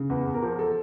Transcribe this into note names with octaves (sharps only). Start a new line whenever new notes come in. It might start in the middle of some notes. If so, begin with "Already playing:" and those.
Already playing: C#3
E2 B4
E2
A#4
F3
A4